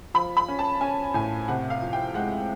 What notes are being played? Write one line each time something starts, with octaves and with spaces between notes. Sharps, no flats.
F3 B5
B5
C#4
A5
C#4 G#5
A2 G#5
C3 F#5
F5
F3
G5
G#3 F#5